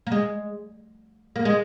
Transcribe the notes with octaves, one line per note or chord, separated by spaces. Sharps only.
A#3
G#3
A#3
G#3